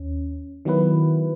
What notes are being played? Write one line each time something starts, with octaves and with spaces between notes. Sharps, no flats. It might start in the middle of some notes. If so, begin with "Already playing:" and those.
Already playing: D#2 C#4
D#3 F#3 B3 E4 B4